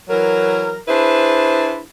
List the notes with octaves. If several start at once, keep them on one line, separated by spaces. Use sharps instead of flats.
E3 F#3 A#4
D4 E4 G#4 B4 C5